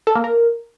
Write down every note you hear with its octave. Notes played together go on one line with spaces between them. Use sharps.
A4
A#3
A#4